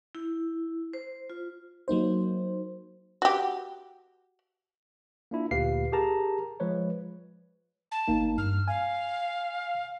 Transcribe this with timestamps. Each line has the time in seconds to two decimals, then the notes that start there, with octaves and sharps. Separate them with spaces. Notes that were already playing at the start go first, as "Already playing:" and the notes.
0.15 E4
0.94 C5
1.30 F4
1.88 F#3 A#3 D#4 C5
3.22 F#4 G4
5.31 A#3 D4 E4 F4
5.51 D2 A#2 G4 B4 F5 C7
5.92 G4 G#4 A#4 A5 A#5
6.60 F3 G#3 B4 C#5
7.91 A5
8.08 G#1 A#3 D#4
8.38 G2 F6
8.68 F5 G#5